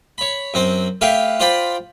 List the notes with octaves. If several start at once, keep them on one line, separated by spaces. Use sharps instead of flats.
C#5 B5
F#2 C4 C5
A3 G4 B4 F5 G5
F4 C5 D5 G5 B5